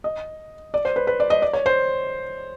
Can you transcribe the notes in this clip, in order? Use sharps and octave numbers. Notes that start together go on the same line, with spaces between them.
D#5
D5
C5
B4
B4
D5
D#5
D5
C#5
C5